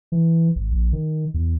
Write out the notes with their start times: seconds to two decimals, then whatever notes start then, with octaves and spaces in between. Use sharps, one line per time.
0.12 E3
0.56 G#1
0.72 A#1
0.93 D#3
1.34 E2